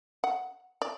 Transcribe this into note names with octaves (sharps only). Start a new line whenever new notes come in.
F#5
D5